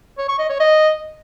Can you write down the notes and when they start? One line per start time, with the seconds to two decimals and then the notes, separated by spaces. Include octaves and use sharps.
0.18 C#5
0.28 C#6
0.39 D#5
0.49 C#5
0.60 D#5